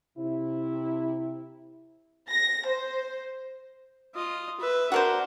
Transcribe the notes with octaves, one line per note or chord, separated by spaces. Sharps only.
C3 E4
A#6
C5
F4 D#5
B4 E5
D4 F#4 A#4 C5